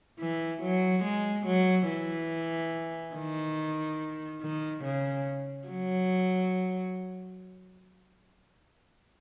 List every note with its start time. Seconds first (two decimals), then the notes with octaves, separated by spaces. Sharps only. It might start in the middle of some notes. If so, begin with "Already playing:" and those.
0.20 E3
0.62 F#3
1.04 G#3
1.46 F#3
1.89 E3
3.15 D#3
4.42 D#3
4.84 C#3
5.68 F#3